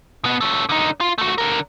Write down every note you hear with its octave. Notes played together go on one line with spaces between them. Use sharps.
B2 B3
C#4 A4
D3 D#4
F4
A3 F#4
D3 A#4